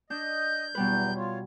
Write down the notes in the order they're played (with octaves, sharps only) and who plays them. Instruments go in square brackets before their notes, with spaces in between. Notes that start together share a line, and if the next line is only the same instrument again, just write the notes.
[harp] D4 [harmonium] D#5 [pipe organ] G6
[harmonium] E2 F#3 [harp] B2 G3 B4
[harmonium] F4 C#5